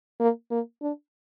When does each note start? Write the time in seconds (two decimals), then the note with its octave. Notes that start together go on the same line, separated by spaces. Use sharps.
0.20 A#3
0.51 A#3
0.82 D4